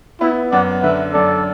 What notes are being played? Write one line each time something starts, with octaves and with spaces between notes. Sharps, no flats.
B3 E4
F#2 D5 F#5
D3 B4 E5
F#2 A4 D5